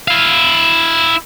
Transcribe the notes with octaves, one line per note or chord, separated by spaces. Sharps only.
E4 F5